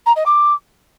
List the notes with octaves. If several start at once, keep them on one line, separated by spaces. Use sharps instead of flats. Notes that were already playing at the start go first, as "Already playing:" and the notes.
A#5
D#5
D6